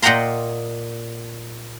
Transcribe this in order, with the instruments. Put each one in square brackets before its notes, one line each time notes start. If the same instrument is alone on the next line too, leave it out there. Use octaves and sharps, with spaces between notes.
[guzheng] A#2 D#5 F#5 G5 A#5 C6